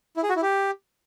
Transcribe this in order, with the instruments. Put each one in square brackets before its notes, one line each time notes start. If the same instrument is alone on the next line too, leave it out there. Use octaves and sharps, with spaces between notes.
[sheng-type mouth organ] E4
G#4
F#4
E4
G4